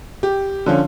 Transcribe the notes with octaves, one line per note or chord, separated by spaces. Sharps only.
G4
D3 F3 C#4